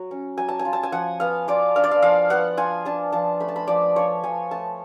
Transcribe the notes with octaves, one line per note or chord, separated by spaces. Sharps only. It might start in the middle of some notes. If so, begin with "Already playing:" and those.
Already playing: F#3
C#4
F#3 G#5
A5
G#5
F4
A5
G#5
F3 F#5
B3 F5
F4 D5
D4 F5
D5
F5
F3 F5
B3 F#5
F4 G#5
D4 A5
F3 A5
A3 B5
A5
B5
F3 D5
F4 C#5
F3 G#5
A3 A5